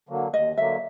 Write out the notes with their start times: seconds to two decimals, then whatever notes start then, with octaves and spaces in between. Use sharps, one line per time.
0.09 D3 F#3 A#3
0.33 D#2 D#5
0.57 D3 F#3 A#3 E5